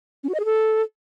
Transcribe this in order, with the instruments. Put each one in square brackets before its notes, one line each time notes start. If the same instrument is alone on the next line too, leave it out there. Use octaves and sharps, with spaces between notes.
[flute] C#4
F#4
D#5
G#4
A4